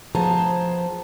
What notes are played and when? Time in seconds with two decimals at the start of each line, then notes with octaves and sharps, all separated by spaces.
0.15 F3 B3 G#4 C5 A5 A#5